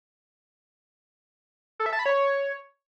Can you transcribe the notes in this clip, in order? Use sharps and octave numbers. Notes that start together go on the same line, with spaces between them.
A4
E5
A5
B5
C#5